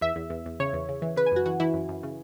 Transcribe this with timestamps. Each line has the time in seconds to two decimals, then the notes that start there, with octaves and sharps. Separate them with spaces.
0.01 E2 E5
0.16 E2
0.30 E2
0.46 E2
0.60 C#3 C#5
0.73 E2
0.89 C#3
1.02 E3
1.16 C#3 B4
1.26 G#5
1.32 F#2 F#4
1.46 E3 F#4
1.60 E3 E4
1.74 F#2
1.89 F#2
2.03 C#3